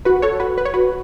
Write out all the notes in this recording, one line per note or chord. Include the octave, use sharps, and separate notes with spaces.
F#4 B4
A4 C#5
F#4 B4
B4
C#5
F#4 B4